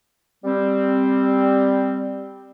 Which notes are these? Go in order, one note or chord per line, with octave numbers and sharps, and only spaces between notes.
G3 C4